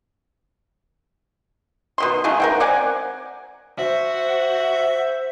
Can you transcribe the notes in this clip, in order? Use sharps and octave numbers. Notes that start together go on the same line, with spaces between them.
B2 D#3 C6
C#3 F#3 G#3 A3
A#4 F#5 G5
C4 D5 F#5 G#5
F#4 C5 E5